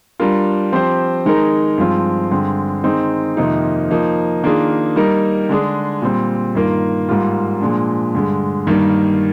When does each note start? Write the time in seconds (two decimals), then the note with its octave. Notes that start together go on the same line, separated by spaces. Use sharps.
0.20 G3 D4 F4 A#4
0.72 F3 C4 G4 C5
1.25 D#3 G#3 D#4 A#4
1.78 G2 F3 G#3 C4 F4
2.31 G2 D3 G#3 C4
2.84 D#3 G#3 C4 D#4
3.37 F2 C3 D#3 A#3 D#4
3.91 F3 A#3 D#4
4.44 D#3 A#3 D4 F4 G#4
4.96 G3 A#3 D#4 A#4
5.49 D3 G#3 D4 G#4
6.02 A#2 G3 C4
6.55 G2 D#3 A#3 F4 A#4
7.09 G#2 G3 A#3 F4
7.61 A#2 F3 G#3 D4
8.15 G2 D3 G#3
8.67 G2 D#3 G3 A#3